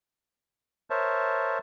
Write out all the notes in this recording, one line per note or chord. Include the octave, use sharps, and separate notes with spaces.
A#4 C5 C#5 E5 A5